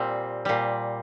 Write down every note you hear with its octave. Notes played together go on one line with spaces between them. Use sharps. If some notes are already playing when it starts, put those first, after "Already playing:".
Already playing: A#2 G3 C4
A#2 G3